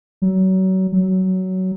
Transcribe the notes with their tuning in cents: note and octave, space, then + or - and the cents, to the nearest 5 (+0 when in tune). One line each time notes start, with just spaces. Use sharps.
F#3 +30
F#3 +15